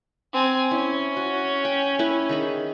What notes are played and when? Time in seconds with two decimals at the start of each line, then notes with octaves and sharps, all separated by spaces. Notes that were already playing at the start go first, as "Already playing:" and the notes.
0.34 C4 G#5
0.71 C#4 E4
1.17 F#4
1.65 G5
1.99 E4 B4
2.29 D#3 G#4 B5